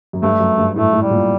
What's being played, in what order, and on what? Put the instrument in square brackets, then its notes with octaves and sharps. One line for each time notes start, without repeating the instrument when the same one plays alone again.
[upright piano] F#2
[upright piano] G2 [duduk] A3
[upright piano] F#2
G2
[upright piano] A2 [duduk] A3
[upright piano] A2
[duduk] G3
[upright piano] A#2